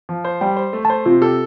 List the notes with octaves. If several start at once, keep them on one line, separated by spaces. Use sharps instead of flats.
F3
C5
G3 G5
C5
A3
A5
C5
C3 F4
G4 A4